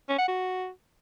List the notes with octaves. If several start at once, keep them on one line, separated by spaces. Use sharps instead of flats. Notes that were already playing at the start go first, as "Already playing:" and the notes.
C#4
F#5
F#4